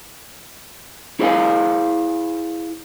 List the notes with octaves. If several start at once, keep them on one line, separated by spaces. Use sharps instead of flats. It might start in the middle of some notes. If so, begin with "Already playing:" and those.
E4 G#4 C5 D#5 F5 G#5